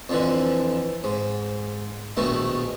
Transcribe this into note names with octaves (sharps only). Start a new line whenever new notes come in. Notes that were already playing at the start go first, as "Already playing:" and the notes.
F2 D3 E3
G#2
A#1 B2 D#3 A3